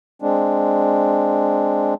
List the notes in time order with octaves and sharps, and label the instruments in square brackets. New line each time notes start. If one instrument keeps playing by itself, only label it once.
[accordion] G#3 C4 D4